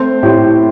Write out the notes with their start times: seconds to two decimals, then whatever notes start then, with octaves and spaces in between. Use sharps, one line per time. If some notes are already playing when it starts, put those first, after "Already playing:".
Already playing: A3 C4 C5
0.23 A2 G4